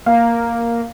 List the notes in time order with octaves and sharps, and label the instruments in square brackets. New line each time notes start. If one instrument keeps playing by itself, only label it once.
[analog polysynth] A#3 [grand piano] F5